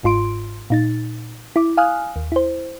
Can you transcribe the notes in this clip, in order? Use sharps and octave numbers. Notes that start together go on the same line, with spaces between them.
G1 G#2 F4 C6 D7
A#2 D#4 A6
E4 D6
F5 G#5 D#6 F6 F#6
D#2
E4 C5